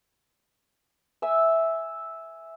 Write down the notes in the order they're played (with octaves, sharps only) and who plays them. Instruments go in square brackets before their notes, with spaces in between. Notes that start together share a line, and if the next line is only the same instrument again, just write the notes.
[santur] E5 G#5 E6